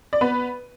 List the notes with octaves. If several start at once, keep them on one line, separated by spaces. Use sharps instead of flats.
D5
B3 B4